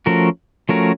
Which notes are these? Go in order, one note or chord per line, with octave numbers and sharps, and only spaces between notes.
F3 A3 C#4 F#4 A#4
F3 A3 C#4 F#4 A#4